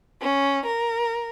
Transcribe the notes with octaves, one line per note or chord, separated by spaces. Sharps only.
C#4
A#4